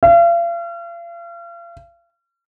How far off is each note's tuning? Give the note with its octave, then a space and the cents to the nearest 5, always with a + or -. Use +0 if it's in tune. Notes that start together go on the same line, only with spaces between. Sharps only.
F5 -40